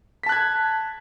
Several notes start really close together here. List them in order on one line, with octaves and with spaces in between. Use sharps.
B6 A5 F#6 G#6